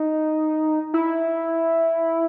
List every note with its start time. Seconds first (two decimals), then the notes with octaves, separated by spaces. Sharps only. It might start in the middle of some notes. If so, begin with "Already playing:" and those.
Already playing: D#4
0.94 E4